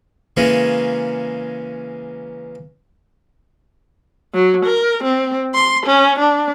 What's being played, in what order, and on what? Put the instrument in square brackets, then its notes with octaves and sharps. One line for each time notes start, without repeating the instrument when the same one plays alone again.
[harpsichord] C#3 E3 G#3 A#3 C#4
[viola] F#3
A#4
C4
C6
C#4
D4